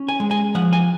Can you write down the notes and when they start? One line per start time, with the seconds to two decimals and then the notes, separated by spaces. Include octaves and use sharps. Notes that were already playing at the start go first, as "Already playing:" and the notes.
Already playing: C#4
0.08 G#5
0.20 G#3
0.31 G#5
0.55 F3 F#5
0.73 G#5